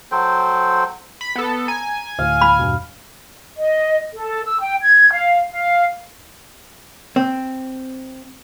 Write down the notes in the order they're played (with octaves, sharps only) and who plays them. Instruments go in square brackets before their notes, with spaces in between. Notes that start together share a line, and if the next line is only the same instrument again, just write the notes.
[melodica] F#3 A4 C5 G5
[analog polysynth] B5
B3 A4
[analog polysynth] G#5 [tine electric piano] A#5
[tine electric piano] D2 A2 [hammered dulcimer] F5
[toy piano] B5
[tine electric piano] E2 G2 B2
[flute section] D#5
A4
E6
G5
G#6
F5
F5
[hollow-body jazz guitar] C4